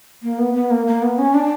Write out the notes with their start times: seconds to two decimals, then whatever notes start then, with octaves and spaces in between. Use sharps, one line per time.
0.23 A#3
0.39 B3
0.54 B3
0.70 A#3
0.87 A#3
1.02 B3
1.18 C#4
1.34 D4